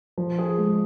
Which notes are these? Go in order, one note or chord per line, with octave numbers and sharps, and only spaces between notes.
F3
G#4
G#3